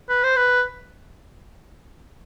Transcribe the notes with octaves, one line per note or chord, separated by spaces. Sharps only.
B4
C5
B4